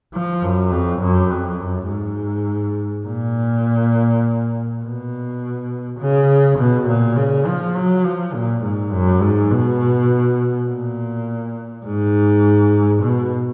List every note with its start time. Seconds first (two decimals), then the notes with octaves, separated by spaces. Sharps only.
0.14 F3
0.42 F#2
0.71 F2
1.02 F#2
1.31 F2
1.60 F#2
1.89 G#2
3.07 A#2
4.83 B2
6.00 C#3
6.59 B2
6.88 A#2
7.17 C#3
7.46 F3
7.75 F#3
8.04 F3
8.34 A#2
8.63 G#2
8.92 F#2
9.21 G#2
9.51 B2
10.68 A#2
11.85 G#2
13.02 B2